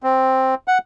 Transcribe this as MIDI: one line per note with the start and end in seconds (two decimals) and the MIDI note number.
0.03 0.55 60
0.68 0.78 78